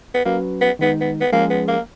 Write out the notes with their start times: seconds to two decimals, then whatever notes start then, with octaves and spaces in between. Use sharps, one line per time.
0.14 B3
0.26 F#3 A#3 C#4 F#4 B4
0.61 B3
0.79 D#3 G#3 B3 D#4
1.01 B3
1.21 B3
1.33 F3 G#3 A#3 C#4 G#4
1.50 B3
1.68 A#3